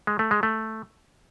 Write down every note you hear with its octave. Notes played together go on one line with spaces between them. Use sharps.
G#3
A3
G#3
A3